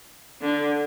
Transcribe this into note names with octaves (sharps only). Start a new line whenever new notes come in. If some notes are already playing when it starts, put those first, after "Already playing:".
D3